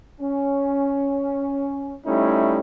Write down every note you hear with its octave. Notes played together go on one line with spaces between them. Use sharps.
C#4
G3 A3 C#4 D#4 E4